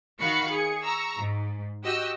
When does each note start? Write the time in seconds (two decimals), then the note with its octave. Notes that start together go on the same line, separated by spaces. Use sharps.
0.21 D#3 F#4 F5 B5 C#6 C#7
0.52 G#4 C#7
0.82 A#5 C#6 E6
1.17 G#2
1.84 F#4 G4 D#5 E6